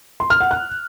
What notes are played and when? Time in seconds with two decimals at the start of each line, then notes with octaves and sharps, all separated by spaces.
0.20 C6
0.30 F6
0.40 F#5
0.51 F#6